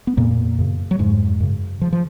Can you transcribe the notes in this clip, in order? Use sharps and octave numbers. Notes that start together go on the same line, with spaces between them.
B3
F2 A#2 C#3 A#3
F#2 C#3
F#3
F2 G#2 C#3 G#3
F#2 C#3
C#3 F3
F3